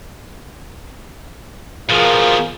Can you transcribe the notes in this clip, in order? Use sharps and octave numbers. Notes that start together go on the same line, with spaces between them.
B2 F3 F4 G#4 A#4